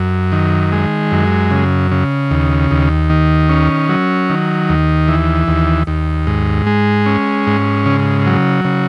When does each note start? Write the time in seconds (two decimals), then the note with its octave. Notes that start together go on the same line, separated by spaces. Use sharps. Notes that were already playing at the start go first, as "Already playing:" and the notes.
Already playing: F#2
0.32 D#3
0.72 G#3
1.12 F#2
1.51 C#3
1.91 C#3
2.31 D#2
2.71 D#2
3.10 D#3
3.49 C#4
3.89 F#3
4.30 D#3
4.69 D#2
5.08 E3
5.48 D#2
5.87 D#2
6.27 G#2
6.67 G#3
7.06 C#4
7.47 G#2
7.86 C#3
8.26 F#3
8.65 C#3